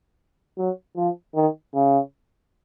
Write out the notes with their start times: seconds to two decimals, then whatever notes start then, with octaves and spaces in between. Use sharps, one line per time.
0.58 F#3
0.96 F3
1.35 D#3
1.75 C#3